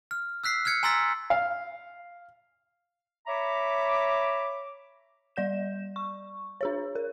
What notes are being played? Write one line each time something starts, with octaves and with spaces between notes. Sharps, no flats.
F6
E6 F#6 B6 C7
F6 F#6 G#6 C#7
G#5 A#5 C6 E6 A6 B6
F5
C#5 E5 A#5 B5 D6
G3 D5 G6 E7
C#6
D4 G#4 C#5
A#4